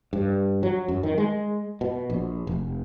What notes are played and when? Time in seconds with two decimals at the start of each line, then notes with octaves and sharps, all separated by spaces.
0.13 G2
0.63 F#3
0.88 F#2
1.03 D#3
1.18 G#3
1.81 B2
2.10 A#1
2.47 F1